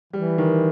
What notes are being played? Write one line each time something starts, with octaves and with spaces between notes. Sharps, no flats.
E3 G3
D#3